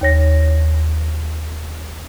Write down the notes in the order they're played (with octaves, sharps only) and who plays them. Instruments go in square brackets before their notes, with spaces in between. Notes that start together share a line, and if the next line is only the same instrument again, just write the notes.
[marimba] D#2 C#5 A#6